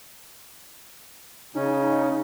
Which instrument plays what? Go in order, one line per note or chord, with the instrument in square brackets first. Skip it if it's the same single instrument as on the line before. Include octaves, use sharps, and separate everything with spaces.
[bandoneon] C#3 C#4 [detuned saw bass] D#4